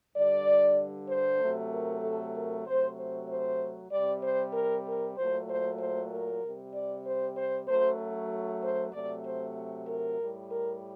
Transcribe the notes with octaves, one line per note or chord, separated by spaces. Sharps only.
G2 D3 G3 D5
C5
C3 F#3 A3
A#4
A4
A#4
C3 F#3 A3 C5
C5
C5
C3 G3 D5
C5
A#4
A#4
A#2 F#3 A3 C5
C5
C5
A#4
C3 G3
D5
C5
C5
F#2 F#3 A3 C5
C5
C3 F#3 A3 D5
C5
A#4
A2 G3
A#4